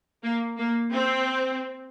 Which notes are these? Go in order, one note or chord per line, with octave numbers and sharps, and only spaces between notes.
A#3
A#3
C4